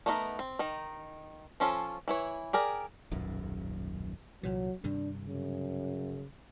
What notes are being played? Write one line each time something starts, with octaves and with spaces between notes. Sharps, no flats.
A3 B3 D#4 F#4 A#4
C4
D#3 D#4
F3 C#4 F4 A4
E3 E4 C#5
G4 G#4 A#4 D5
D#1 B1 F#2
C2 A#2 E3 F#3
G2 C3 D#3 D4
F#2 C#3